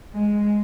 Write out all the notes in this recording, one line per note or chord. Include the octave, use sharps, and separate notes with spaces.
G#3